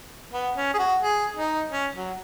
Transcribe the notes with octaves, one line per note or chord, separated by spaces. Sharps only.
B3
C#4
G#4
F#4
G#4
D#4
C#4
F#3